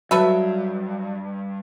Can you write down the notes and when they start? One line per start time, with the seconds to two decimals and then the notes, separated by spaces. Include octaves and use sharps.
0.11 G2 F#3 A4 B4 E5